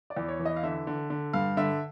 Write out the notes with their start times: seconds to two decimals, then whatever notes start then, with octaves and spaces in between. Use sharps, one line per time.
0.10 D5
0.17 E2
0.28 C#5
0.40 E3
0.45 D#5
0.56 F5
0.63 D3 E5
0.87 D3
1.10 D3
1.33 G2 F5
1.57 D3 E5